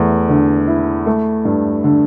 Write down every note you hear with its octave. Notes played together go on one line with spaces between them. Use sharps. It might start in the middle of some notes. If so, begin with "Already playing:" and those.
Already playing: E2 A3
D3
E4
A3
G2
D3